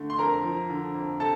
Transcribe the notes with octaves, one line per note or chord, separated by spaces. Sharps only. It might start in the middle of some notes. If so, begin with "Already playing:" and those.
Already playing: D3 A3
C6
F2 A#4 A#5
F3
D3
F2
C3 A4 A5